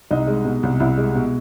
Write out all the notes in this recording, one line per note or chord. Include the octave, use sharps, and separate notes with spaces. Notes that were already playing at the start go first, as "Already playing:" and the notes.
C2 D#4
G#3
B2
C2
C2 E4
G#3
B2